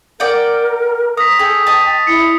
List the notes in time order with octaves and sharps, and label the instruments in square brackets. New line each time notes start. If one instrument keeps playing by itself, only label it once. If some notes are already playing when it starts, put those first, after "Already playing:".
[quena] A#4 [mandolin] D5 F#5 G5
[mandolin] A#5 [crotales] D#6 B6
[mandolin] G#4 A4 [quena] G5
[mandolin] D#5 A5
[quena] E4 [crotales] C#7